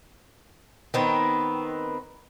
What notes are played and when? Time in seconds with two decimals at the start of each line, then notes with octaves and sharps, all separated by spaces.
0.94 D#3 B3 C4